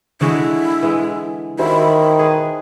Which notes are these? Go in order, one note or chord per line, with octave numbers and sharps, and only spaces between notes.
D3 G#3 E4 F#4 D5
E3 G#3
D#3 F#4 C5 E5 B5
G#4 B4